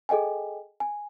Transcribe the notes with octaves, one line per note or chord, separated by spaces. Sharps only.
G#4 A4 D#5 G5 G#5
G#5